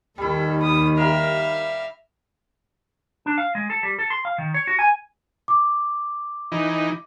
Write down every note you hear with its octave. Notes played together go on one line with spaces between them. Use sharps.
D#2 D#3 G3 E4 A4
D#6
G3 A#4 E5 F5
D4
F5
G#3
A4
G3
A4
C6
F5
D#3
C#5
F#4
G#5
D6
E3 D#4